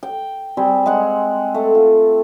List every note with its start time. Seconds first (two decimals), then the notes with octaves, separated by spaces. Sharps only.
0.03 G5
0.57 G3 C4 G#4
0.86 G#3 F#5
1.55 A3
1.75 F4